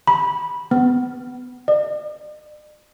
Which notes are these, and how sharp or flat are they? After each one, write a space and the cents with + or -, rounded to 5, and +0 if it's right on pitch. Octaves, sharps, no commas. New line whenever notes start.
B5 -15
B3 +15
D5 +45